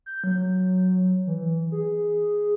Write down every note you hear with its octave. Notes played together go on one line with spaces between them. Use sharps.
G6
F#3
E3
G#4